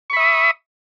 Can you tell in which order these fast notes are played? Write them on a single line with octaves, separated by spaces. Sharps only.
C#6 B5 E5 D#6